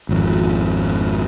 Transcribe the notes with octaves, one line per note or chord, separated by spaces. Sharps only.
G#1 F2